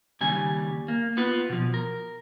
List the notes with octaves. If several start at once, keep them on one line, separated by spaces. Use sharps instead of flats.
D#2 C#3 G3 G#5
A#3
B3 F4 B4
B2 F3
A#4